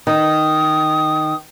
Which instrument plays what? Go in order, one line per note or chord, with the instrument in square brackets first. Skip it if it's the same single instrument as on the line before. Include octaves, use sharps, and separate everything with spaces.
[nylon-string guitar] D#3 [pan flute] D#6